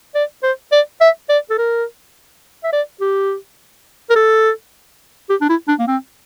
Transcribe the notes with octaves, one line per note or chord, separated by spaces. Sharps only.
D5
C5
D5
E5
D5
A4
A#4
E5
D5
G4
A#4
A4
G4
D4
E4
D4
A#3
C4